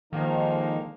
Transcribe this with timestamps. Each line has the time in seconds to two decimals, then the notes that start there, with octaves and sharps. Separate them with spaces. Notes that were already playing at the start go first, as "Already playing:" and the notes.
0.13 D3 D#3 F3 G#3 A#3 D#4